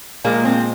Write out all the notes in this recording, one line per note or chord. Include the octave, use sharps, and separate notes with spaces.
A#2 F3 G#3 A#3
C4